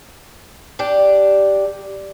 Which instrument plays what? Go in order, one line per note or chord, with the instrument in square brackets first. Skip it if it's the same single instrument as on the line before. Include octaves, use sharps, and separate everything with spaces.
[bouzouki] D4 G4